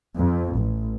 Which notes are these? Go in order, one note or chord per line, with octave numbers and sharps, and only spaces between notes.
F2
A1